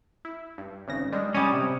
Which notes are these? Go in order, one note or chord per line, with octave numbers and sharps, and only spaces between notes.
E4
G2
G#1 C#3 A#6
G3 G#3 D4
G3 C#4 G#5 D#6
C3